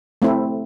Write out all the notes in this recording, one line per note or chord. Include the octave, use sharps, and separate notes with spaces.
A3 C4 E4